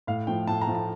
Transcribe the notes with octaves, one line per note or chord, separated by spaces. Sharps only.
A2 F5
F3 A3 G5
A2 A5
A#5
F3 A3
A5